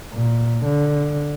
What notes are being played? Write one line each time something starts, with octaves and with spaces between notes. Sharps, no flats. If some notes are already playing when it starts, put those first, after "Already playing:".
A#2
D3